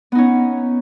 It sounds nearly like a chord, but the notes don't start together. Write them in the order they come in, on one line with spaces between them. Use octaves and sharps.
B3 D#4 C#4